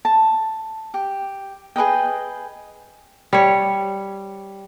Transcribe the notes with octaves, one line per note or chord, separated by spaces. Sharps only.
A5
G4
G#4 B4 D#5 G5
G3 C#5